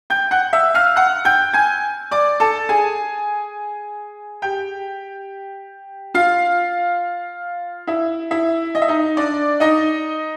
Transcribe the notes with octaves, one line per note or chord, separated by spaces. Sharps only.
G5 G6
F#5 F#6
E5 E6
F5 F6
F#5 F#6
G5 G6
G#5 G#6
D5 D6
A4 A5
G#4 G#5
G4 G5
F4 F5
E4 E5
E4 E5
D#5
E5
D#4 D#5
D4 D5
D#4 D#5